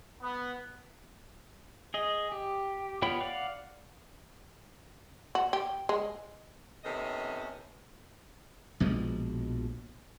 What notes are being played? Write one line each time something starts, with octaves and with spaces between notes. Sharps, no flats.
B3
G#4 D#5
G4
B3 F4 C#5 G5 B5
D5 F5 F#5 D6
F#4
G4
G#3
D#2 C3 B3 C#4 A4 D#5
A#1 B2 F3 G#3